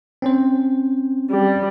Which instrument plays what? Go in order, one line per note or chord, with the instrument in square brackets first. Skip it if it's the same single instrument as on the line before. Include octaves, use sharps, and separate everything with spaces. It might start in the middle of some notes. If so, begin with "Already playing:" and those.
[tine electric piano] C4 C#4 C5
[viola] G3